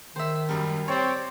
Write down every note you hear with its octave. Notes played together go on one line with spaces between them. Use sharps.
D#3 C5 E5
F#2 G3 A#4
C4 G4 C#5 D5